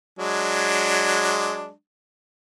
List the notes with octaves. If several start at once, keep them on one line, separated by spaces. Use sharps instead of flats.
F#3 G#3 D4